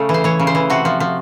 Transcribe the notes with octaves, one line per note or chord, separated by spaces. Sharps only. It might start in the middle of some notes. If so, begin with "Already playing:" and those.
Already playing: C#3 A3
E3
C5
E3 C#5
C#3
C5
E3
C3 F#4
F3
F3